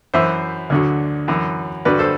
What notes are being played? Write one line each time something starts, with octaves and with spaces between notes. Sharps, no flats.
F#2 E3 C5 E5
D2 D3 F#3
F#2 E3
G2 D3 F#3 B4 D5
A4 C5